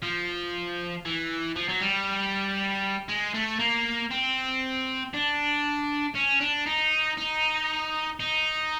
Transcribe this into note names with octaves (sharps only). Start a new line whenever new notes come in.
F3
E3
F3
F#3
G3
G#3
A3
A#3
C4
D4
C#4
D4
D#4
D#4
D#4